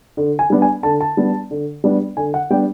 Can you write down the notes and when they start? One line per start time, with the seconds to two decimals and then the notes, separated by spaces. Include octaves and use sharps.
0.17 D3
0.39 G#5
0.50 G3 B3 D4
0.62 G#5
0.83 D3 A5
1.01 A5
1.17 G3 B3 D4
1.51 D3
1.84 G3 B3 D4
2.17 D3 G#5
2.34 F#5
2.50 G3 B3 D4 G5